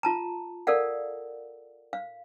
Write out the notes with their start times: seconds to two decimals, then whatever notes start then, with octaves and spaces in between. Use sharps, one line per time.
0.03 F4 A5 A#5
0.67 A4 A#4 D5 F5 F#5
1.93 F5